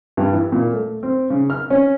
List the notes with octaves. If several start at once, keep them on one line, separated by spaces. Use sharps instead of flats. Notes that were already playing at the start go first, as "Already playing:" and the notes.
G2
E3
A#2
A3
C4
C#3
F6
C#4